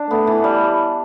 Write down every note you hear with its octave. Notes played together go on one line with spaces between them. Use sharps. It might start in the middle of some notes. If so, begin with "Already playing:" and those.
Already playing: D4
A3 B3
E3
G3